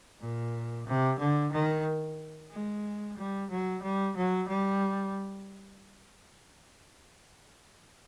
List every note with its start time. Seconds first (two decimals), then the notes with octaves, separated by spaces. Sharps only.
0.21 A#2
0.87 C3
1.19 D3
1.53 D#3
2.52 G#3
3.18 G3
3.51 F#3
3.83 G3
4.17 F#3
4.49 G3